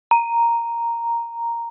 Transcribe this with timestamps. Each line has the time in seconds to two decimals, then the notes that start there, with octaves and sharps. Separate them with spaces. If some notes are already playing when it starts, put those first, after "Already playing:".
0.11 A#5